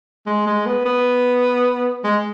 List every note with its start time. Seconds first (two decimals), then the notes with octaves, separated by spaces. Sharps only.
0.26 G#3
0.47 G#3
0.66 B3
0.85 B3
2.04 G#3